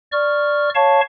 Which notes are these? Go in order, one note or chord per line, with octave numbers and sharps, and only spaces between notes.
D5 C#6 F6
C#5 F5 A5 C#6